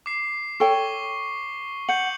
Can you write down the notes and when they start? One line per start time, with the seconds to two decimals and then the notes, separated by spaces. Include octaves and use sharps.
0.06 D6 C7
0.60 A4 C#5 G5 C#6 G7
1.89 F#5 G6 C#7 F#7